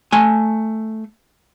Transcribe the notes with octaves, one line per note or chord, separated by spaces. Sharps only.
A3 G#5